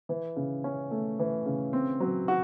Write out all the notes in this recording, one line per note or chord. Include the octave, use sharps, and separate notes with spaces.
E3
C#3
C#4
A3
E3
C#3
C4
F#3
F#4